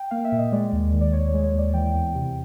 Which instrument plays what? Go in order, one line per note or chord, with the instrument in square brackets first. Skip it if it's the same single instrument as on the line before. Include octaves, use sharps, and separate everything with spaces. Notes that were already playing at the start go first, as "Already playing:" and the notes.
Already playing: [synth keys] G5
A#3 F5
E5
A#2
D#5
G#3 D5
D#2
D#3
D5
D#2 C#5
C#5
G#3
C#5
D#2 D5
E3 G5
E2
C3